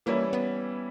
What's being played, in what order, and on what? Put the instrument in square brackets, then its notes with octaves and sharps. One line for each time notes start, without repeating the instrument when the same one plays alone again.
[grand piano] E3 G3 C#4 E4 [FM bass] A#3
[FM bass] B3